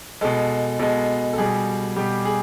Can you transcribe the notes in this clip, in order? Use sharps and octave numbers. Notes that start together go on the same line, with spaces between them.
B2 G#3 A4
B2 G#3 A4
A4
B2 G3 G#4
B2 G3 G4
G#4